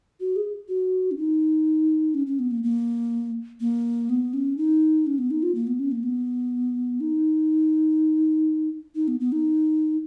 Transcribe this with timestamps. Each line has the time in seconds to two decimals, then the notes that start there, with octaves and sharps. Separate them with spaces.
0.20 F#4
0.36 G#4
0.69 F#4
1.11 C#4
1.17 D#4
2.14 C#4
2.27 C#4
2.39 B3
2.51 A#3
2.63 A#3
3.60 A#3
4.09 B3
4.33 C#4
4.57 D#4
5.07 C#4
5.18 B3
5.31 D#4
5.43 F4
5.55 A#3
5.67 B3
5.79 C#4
5.92 A#3
6.03 B3
7.00 D#4
8.95 D#4
9.08 B3
9.20 B3
9.32 D#4